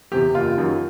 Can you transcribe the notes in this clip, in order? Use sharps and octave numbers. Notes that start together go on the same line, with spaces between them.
E2 C3 G4
F#1 F4
F#2 D#3 F#3